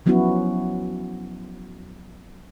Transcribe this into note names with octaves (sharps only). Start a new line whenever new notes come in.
F3 F#3 B3 C#4 E4 F#4